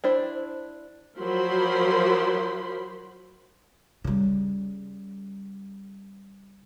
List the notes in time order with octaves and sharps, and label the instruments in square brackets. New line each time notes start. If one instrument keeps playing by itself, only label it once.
[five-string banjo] D4 E4 C5
[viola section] F3 F#3 A#4 C5 B5 C6
[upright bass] C#3 G3